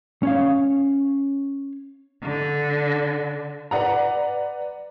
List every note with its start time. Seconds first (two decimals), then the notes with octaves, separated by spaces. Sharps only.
0.23 C#4 C#5 F5
2.23 D3
3.71 B4 D5 F#5 A#5